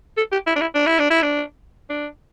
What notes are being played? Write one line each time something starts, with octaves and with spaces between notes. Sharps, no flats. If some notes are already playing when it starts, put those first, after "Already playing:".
A4
G4
E4
D4
E4
D4
E4
D4
E4
D4
D4